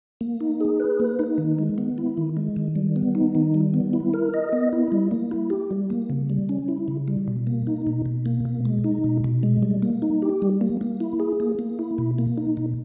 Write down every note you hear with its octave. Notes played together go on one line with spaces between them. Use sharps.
A#3
D#4
G#4
B4
A#3
D#4
D#3
G#3
B3
E4
D#3
G#3
D#3
G3
B3
D#4
D#3
G3
B3
E4
A#4
D#5
B3
E4
G3
A#3
E4
G4
G3
A#3
C#3
G3
C#4
E4
C#3
G3
B2
A#3
D#4
B2
B2
A#3
B2
G#3
D#4
B2
B2
G#3
G3
A#3
D#4
G4
G3
A#3
A#3
E4
G#4
A#3
A#3
E4
B2
A#3
D#4
B2